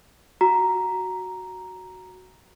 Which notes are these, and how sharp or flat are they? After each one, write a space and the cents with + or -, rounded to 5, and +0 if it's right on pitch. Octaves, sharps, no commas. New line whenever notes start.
F#4 +0 A#5 +0